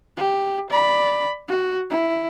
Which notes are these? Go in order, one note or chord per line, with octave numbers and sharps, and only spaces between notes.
G4
D5 B5
F#4
E4